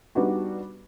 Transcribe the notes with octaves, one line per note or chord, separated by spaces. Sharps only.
G3 B3 D4 D#4 F#4